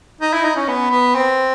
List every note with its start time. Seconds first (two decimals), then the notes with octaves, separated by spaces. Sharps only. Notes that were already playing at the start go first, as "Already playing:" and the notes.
0.21 D#4
0.33 E4
0.44 D#4
0.56 C#4
0.69 B3
0.91 B3
1.15 C4